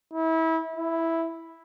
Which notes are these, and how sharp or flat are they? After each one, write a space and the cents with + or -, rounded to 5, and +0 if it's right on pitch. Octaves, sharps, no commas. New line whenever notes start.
E4 -30
E4 +0